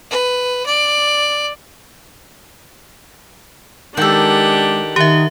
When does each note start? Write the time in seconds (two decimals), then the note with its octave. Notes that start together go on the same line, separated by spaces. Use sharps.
0.10 B4
0.66 D5
3.97 D#3 G#3 D4 G4 A4 F#5
4.96 D#3 G4 E5 F#5